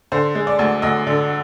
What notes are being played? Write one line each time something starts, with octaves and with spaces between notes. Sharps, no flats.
D3 C5
G#3
D5
D2
D2 D#5
D3